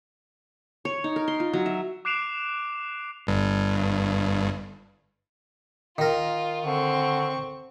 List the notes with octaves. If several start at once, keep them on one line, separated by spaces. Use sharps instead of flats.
C#5
D#4
A#4
C6
F4
F#3
E5
D6 F#6 C7 D7 E7 F7
G1 G2
D#3 F4 A#4
D3 C4 C#6